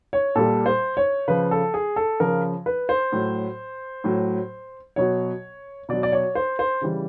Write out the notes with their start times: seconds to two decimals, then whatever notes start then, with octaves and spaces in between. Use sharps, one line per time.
0.13 C#5
0.36 A#2 G3 A4
0.66 C5
0.97 C#5
1.28 C#3 F3 B4
1.51 A4
1.74 G#4
1.96 A4
2.20 C#3 F3 A#4
2.66 B4
2.89 C5
3.12 A2 F#3
4.04 A2 F#3
4.96 B2 F#3 C#5
5.89 B2 F#3 D5
6.03 D5
6.12 C#5
6.35 C5
6.59 C5
6.81 C#3 E3 G3